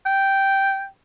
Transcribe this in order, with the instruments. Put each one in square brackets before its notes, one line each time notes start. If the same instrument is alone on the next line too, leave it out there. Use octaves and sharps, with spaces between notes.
[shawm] G5